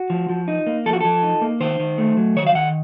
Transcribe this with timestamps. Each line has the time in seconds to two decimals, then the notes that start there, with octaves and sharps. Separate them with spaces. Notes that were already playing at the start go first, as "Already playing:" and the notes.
Already playing: F#4
0.10 F3
0.29 F3
0.48 D#4
0.67 A#3
0.86 F3 A4
0.93 F#4
1.01 F3 A4
1.23 D#4
1.42 A#3
1.60 D#3 C5
1.80 D#3
1.98 A3
2.17 F#3
2.36 D#3 C#5
2.47 F5
2.55 D#3 F#5